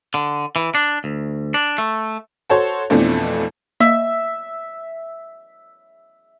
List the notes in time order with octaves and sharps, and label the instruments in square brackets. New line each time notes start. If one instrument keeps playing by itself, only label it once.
[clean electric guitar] D3
E3
D4
D2
D4
A3
[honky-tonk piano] F#4 A4 C5 C#5
F2 B2 E3 F3 A3 D4
[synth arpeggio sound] A#3 [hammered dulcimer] E5